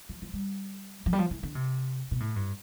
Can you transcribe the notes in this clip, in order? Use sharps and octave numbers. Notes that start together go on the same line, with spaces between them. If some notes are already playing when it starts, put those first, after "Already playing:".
F3
F3
G3
F3
G3
F3
E3
D3
C3
B2
A2
G2